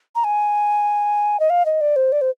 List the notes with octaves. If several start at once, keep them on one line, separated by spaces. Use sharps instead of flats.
A#5
G#5
D#5
F5
D#5
D5
C5
D5
C5